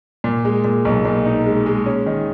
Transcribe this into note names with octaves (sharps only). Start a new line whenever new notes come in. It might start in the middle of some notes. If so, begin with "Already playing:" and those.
A#2
G#3
A#2
B1
A#2
D#4
G#3
G#3
C#4
D#3